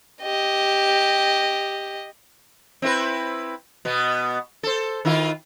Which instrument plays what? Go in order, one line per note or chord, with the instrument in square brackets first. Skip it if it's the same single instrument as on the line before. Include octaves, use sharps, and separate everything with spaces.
[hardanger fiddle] G4 D#5
[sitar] C4 E4 B4
B2 B3
A4 C5
D#3 E4 F4